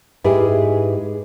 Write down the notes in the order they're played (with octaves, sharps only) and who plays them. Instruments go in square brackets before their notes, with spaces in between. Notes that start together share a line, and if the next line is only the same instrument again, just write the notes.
[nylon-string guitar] G#2 G#3 E4 G4 G#4 B4